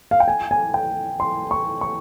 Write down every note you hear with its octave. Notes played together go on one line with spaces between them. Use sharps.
F5
G5
G#5
G#5
G5
C6
C#6
C#6